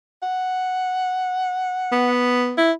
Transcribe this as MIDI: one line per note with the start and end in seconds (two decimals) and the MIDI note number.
0.23 2.15 78
1.92 2.56 59
2.58 2.72 64